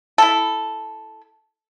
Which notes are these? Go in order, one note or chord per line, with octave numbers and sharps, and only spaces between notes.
E4 A4